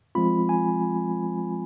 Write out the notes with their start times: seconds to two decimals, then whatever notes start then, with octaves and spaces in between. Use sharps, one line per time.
0.15 F3 G#3 C4 F4 B5
0.49 G#5